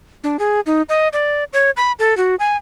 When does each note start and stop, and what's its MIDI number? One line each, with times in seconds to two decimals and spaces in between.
0.24 0.37 62
0.39 0.60 68
0.66 0.82 63
0.89 1.08 75
1.13 1.44 74
1.53 1.71 73
1.77 1.92 83
1.99 2.17 69
2.17 2.35 66
2.40 2.57 80